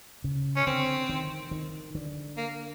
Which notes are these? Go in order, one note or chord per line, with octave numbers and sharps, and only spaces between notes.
C#3
C#4
D3 C4
D#3
D#3
D3
A#3